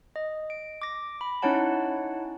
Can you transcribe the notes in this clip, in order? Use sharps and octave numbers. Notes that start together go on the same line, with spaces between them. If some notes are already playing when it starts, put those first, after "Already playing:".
D#5
D7
D6 A#6
B5
C#4 D#4 E4 C#5 F#5 A5